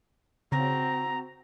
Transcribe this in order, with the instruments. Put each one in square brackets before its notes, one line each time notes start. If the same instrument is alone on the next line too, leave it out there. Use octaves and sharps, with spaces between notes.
[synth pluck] C#3 [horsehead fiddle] C4 F#4 [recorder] A#5